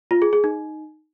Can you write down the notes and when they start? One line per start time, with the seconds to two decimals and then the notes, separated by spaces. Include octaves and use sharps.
0.11 F4
0.22 G#4
0.33 G#4
0.44 D#4